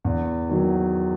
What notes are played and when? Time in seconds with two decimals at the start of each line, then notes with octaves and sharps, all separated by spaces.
0.05 E2
0.49 D#3 F#3